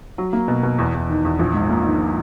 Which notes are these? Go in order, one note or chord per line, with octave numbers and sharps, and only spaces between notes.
F#3
A#3
B2
B2
E2
E2
D#3
E2
A#1
G#2
A#3
D#3